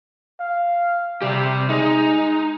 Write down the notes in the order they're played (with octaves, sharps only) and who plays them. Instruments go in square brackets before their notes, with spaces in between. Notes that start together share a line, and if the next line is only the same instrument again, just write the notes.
[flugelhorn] F5
[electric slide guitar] C3 G4 [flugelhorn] G3
[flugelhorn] G#3 [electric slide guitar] D#4